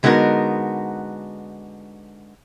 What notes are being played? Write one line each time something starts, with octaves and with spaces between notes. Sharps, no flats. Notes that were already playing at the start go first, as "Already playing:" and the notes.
D3 G#3 B3 D#4 F#4 A#4